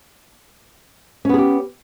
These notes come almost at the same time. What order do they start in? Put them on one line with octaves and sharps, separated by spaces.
C#4 B3 G#4 G4